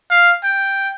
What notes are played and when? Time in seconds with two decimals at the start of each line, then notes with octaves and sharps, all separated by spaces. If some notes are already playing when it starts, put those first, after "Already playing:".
0.10 F5
0.44 G5